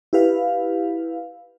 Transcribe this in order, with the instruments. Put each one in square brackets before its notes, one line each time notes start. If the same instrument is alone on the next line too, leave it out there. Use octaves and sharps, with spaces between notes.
[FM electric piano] E4 G4 B4 F5